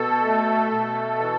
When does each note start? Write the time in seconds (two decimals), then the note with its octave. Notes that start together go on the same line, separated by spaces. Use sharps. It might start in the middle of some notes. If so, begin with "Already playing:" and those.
Already playing: B2 A4
0.24 A3
0.71 B2
1.19 E3